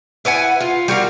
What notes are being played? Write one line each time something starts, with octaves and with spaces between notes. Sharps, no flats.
E4 B4 F#5 G#5
F4
G3 F#4 A#4 F5